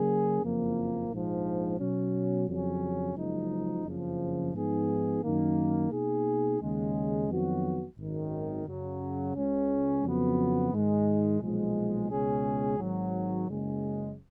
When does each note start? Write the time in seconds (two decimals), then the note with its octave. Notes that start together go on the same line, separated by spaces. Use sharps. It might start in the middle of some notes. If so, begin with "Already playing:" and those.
Already playing: C#3 F#3 A#3 C#4 G#4
0.42 F#1 F2 F3 A#3
1.09 A#1 G#2 F3
1.79 B2 F#3 C#4
2.48 F2 C#3 F#3 C#4
3.16 F#1 F#2 F3 G#3 D#4
3.84 F#1 F2 C#3 F3
4.53 G#2 F3 B3 D#4 G#4
5.23 F#2 D#3 A#3
5.91 B2 A#3 D#4 G#4
6.59 D#2 C#3 G#3
7.28 F2 D#3 F#3 B3 F#4
7.97 G#1 F#2 D#3
8.66 F#2 C#3 F#3
9.34 C#2 C#3 G#3 C#4
10.03 F2 C#3 F#3 B3 F#4
10.72 G#2 D#3 G#3
11.40 B1 A#2 F3 G#3
12.09 C#2 B2 G#3 C#4 G#4
12.78 G#1 G#2 D#3 F#3
13.47 F#1 F#2 C#3 G#3